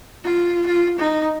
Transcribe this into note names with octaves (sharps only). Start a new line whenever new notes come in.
F4
F4
D#4